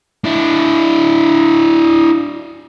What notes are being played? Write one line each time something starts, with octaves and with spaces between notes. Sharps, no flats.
D4 E4